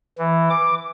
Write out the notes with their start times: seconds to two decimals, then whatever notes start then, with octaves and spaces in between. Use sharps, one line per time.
0.18 E3
0.50 D6